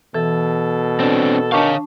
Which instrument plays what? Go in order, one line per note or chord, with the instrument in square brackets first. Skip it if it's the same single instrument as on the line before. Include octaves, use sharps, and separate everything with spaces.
[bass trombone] B2 [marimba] E3 [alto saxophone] A4
[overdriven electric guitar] C4 D4
[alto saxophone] D#3 [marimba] D4 A5 C#6 [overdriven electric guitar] C#5 F5